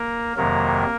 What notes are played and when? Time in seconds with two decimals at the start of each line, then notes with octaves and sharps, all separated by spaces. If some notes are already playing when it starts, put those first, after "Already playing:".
Already playing: A#3 A#4
0.37 F2 C3 D#3 F#3 A#3 A#4